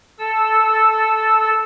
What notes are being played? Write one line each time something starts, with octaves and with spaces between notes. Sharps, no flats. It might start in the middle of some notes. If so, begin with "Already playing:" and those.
A4 E6